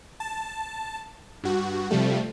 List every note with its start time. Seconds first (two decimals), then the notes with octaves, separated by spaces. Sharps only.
0.20 A5
1.44 G2 F#4
1.91 C3 F3 G3 A3